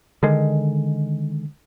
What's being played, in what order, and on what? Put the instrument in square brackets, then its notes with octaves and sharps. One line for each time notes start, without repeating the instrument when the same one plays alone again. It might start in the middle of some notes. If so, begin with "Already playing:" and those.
[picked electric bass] D3 D#3 G#3